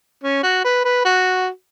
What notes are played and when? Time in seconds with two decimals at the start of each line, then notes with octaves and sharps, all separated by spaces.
0.23 C#4
0.43 F#4
0.64 B4
0.84 B4
1.05 F#4